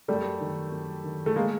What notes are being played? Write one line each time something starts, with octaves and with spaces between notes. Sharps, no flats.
F#2 G3 A3
D#3
F#2
D#3
A3
G#3 A#3